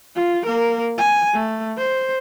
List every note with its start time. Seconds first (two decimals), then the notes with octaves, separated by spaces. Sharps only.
0.15 F4
0.46 A#3 A#4
0.98 G#5
1.33 A3
1.78 C5